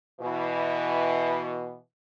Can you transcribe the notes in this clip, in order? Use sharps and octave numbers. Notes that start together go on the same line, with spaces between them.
B2 E3